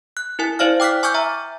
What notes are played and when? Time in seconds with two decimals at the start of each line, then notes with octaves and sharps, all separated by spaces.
0.17 F#6
0.39 E4 A#4 G#5
0.59 E4 C5 D5 F5 F6
0.80 G5 D6 F6 F#6 B6
1.03 G#5 C#6 D6 E6 F6 G6
1.14 E5 A#5